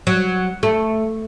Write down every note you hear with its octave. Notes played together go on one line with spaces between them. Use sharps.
F#3
A3